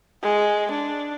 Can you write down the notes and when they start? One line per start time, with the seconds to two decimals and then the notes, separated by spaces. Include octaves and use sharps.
0.23 G#3
0.72 D4